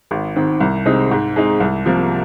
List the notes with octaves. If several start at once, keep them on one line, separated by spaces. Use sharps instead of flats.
G#1
G#2 D#3 C4
C2
C3 G#3 C4 D#4
G#2
G#3 C4 D#4
C2
C3 F3 A#3